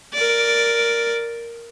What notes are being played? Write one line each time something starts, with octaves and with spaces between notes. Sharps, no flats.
A#4 D5